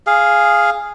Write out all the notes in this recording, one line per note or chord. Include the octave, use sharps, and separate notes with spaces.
G#4 F5